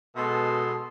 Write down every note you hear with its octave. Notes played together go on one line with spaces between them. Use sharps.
B2 G#3 A4 D#5 C6